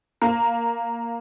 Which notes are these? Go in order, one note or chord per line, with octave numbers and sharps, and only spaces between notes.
A#3